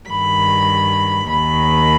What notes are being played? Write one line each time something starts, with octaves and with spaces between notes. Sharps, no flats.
G2 D#3 B5
D#2 D#3 B5